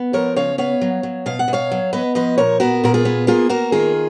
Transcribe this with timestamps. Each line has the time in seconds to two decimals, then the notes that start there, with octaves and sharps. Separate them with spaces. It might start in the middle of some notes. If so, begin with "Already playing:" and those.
Already playing: B3
0.13 F3 A#4 C#5
0.36 C#3 C#5 F5
0.58 B3 C#5 F5
0.81 F#3
1.03 F#3
1.26 B2 F5
1.39 F#5
1.48 B2
1.53 C#5 F5
1.71 F#3
1.93 B3 B4 D#5
2.15 F3 B4 D#5
2.38 A#2 A#4 C#5
2.60 B3 F#4 A#4
2.84 A#2 A#4
2.94 F4 G#4
3.05 B3
3.27 A#3 F4 G#4
3.49 A#3 F#4 A#4
3.72 D#3 F4 G#4